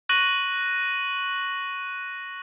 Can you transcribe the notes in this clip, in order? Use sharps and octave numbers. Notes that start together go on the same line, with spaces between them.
C#6 F#6 A#6 D#7 F#7